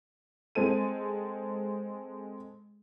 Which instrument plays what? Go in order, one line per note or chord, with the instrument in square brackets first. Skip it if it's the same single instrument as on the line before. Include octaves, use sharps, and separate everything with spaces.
[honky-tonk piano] G#3 C4 A4 D#7